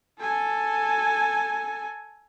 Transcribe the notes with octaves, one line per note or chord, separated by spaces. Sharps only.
A4 G#5